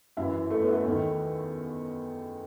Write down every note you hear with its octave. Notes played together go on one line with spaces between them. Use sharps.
F#2 E4
E3
A3
B3
A3
E2 D#3